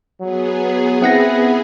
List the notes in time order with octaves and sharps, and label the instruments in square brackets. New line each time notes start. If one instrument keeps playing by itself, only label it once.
[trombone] F#3 [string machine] B3 G#4
[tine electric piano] C4 F#5 A#6 [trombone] E4